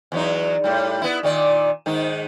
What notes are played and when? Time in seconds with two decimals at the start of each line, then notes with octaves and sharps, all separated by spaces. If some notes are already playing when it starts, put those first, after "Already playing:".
0.12 E2 F#3 D#4
0.64 A2 G3
1.02 B3 E4
1.23 A#2 D#3 D5
1.86 G#2 D#3 D#4